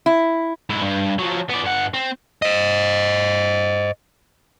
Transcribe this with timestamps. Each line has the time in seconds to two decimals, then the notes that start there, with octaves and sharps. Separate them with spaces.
0.06 E4
0.70 G#2 E4
0.82 G2
1.19 F3 F#3
1.49 B3 D5
1.64 G2 F#5
1.94 C4
2.42 C5 D#5